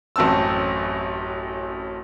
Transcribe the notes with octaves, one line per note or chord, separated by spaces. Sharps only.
A1 F#2 C4 A5 E6